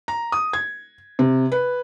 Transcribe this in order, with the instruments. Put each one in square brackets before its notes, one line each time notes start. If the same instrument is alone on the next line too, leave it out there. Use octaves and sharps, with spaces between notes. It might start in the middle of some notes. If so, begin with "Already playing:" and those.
[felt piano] A#5
D#6
G#6
C3
B4